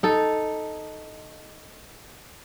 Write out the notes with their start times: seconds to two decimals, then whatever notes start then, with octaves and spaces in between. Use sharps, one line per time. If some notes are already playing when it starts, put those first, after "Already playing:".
0.03 D#4 A4